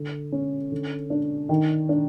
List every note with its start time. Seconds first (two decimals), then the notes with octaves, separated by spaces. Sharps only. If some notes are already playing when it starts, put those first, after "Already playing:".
Already playing: D3
0.32 C#4
0.72 D3
1.10 D4
1.49 D#3
1.89 D4